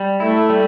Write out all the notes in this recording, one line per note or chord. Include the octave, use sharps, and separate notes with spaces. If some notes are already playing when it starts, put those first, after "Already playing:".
Already playing: G3
A3 E4
G3